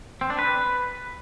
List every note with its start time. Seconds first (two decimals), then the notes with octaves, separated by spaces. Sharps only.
0.21 C4
0.30 D4
0.39 B4